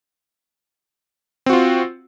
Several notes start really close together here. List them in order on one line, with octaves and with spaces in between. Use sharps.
C4 F#4 F4